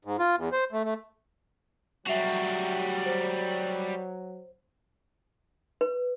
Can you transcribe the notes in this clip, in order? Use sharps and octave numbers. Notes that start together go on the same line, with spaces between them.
G#2
F4
E2
C5
A3
A3
F#3 G3 F#4 E5 C7 F7
C5
B4